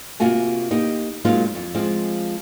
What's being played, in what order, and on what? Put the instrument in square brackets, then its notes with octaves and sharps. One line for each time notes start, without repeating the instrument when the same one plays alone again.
[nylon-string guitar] C3 A#3 F4 F#4 G#5
A#3 D#4 G4
F#3 G#3 A#3 D#4 F4
F2
F3 G#3 C4 F4